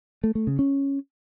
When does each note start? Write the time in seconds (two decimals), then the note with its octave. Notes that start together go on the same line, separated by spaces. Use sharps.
0.24 A3
0.35 A3
0.47 C#3
0.59 C#4